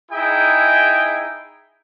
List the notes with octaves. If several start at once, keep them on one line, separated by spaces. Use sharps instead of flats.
D#4 E4 G#4 E5 G5